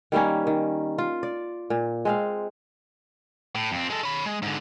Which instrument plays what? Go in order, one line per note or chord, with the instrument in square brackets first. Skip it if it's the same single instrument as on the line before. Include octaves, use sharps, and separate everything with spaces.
[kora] D#3 G3 A#3 C#4
D#3
F4
D5
A#2
G#3 C4 F5
[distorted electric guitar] A2
F2 C4
G#3 A4
C#4 B5
G#3
G#2 D3